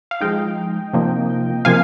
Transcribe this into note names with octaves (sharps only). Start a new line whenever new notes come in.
F5
F3 G#3 D#4 D#5 G5
C3 F3 A#3 D#4
C3 F3 A#3 F5 G#5